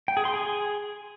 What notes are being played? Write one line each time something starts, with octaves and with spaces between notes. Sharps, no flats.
G5
G#4
C6
G#4